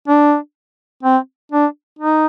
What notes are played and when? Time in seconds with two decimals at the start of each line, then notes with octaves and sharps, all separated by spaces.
0.08 D4
1.03 C4
1.52 D4
1.99 D#4